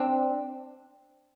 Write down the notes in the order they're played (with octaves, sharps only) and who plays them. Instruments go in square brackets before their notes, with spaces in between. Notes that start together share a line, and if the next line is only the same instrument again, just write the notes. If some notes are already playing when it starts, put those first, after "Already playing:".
Already playing: [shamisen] C4 D4